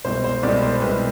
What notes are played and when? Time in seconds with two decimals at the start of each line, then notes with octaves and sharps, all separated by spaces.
0.05 C2 B2 G#3 C5
0.24 C5
0.43 C2 B2 G#3 D5
0.62 C5
0.82 C2 B2 G#3 B4